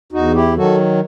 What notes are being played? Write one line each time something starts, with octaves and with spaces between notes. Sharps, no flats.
E2 D#4 F#4
E4 G4
D#3 F#3 F#4 A4